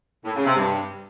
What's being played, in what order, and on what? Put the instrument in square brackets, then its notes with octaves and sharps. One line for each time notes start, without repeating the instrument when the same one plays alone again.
[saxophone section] A2
C#3
C3
G2